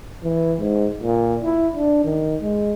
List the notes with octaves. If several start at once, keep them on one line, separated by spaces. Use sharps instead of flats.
E3
G#2
A#2
E4
D4
D#3
G#3